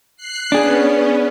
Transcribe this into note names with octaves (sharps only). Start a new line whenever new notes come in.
F#6 C7
B3 C#4 D4 G#4